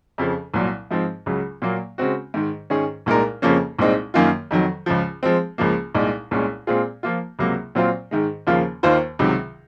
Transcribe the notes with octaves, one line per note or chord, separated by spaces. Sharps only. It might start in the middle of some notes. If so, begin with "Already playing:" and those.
F2 C#3 F3
C2 A#2 F#3
G#2 F3 G#3 C4
C#2 C#3 F#3
A#2 F#3 A#3
C#3 G#3 C4 F#4
G#2 D#3 G#3
G#2 D#3 G#3 C#4 G#4
C2 A#2 G#3 D#4 A#4
F2 C#3 F3 A#3 C#4
C2 A#2 G#3 C4 D#4
F#2 D#3 A#3 F4
F2 D#3 F#3
C#2 C#3 F3
F3 G#3 C4
C#2 C#3 F3 A#3
C2 A#2 G#3 D#4
C2 A#2 G#3 C#4
A#2 G#3 C4 F4 G#4
F3 A#3 F4
C#2 C3 F#3 A#3
A#2 F#3 C4 F4 C5
G#2 D#3 G#3
D#2 C#3 F3 A#3 F4
D#2 D#3 A#3 F4 C5
C#2 C3 D#3 F#3